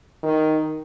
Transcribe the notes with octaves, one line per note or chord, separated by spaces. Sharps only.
D#3